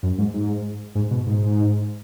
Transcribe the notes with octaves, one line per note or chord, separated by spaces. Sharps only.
F#2
G#2
G#2
G#2
B2
G#2